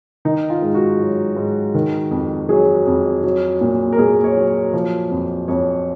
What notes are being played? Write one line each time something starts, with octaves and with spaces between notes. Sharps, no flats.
D#3 D#4
F4
G#2
F#4
F#3
G#2
D#3
F2
F#3 G#4
F2
F#3
A#2
A#4
A#2 G#4
C#5
F#3
F3
F2
F2 C#5